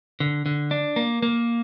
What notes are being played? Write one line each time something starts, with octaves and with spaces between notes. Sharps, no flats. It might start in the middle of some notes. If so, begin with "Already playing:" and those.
D3
D3
D4
A#3
A#3